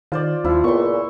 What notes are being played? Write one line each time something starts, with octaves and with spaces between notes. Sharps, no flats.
D#3 F4 C5 D5
D#2 F3 E4
C#2 A#2 B3 C6 C#6